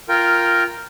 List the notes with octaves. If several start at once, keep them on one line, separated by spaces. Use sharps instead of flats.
F4 A#4 G5